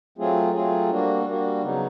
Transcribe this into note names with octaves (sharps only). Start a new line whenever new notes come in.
F#3 A3 C4 F4 G#4
F#3 A3 C4 F4 G#4
G3 A#3 D4 F#4
G3 A#3 D4 F#4
C#3 F#3 B3 D#4